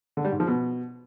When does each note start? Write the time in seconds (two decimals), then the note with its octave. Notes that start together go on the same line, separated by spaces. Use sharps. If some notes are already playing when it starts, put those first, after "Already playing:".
0.17 D3
0.25 G3
0.32 G#2
0.40 F3
0.47 B2